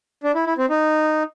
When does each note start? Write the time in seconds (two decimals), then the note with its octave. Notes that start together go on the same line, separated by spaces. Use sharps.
0.23 D4
0.35 E4
0.46 E4
0.58 C4
0.69 D#4